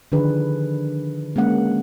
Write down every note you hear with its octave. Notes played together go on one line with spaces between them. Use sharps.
D3 D#3 F3 D4 G#4 B4
G#3 A#3 C#4 F#5